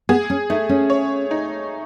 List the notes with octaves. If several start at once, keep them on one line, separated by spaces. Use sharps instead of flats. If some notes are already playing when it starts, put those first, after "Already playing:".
B3 G#4
C#4
A3 D#4
C#4
C#5
D#4